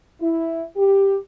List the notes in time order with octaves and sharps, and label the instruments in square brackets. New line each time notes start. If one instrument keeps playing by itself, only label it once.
[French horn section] E4
G4